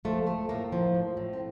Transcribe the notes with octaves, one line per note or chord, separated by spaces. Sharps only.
F3 A3
A3
A2 A#3
F3
A2
A2
C4